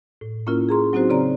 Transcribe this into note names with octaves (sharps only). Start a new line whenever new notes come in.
A2
A#3 C#4 E4 F4 A#4
G#4 A#5 C6
F#3 C4 D#4 F#4 C5
C#3 C4 D5 A#5